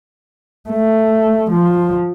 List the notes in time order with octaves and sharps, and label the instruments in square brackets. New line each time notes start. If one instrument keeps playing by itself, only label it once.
[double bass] A3
F3